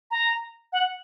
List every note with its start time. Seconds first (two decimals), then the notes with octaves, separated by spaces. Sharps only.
0.11 A#5
0.73 F#5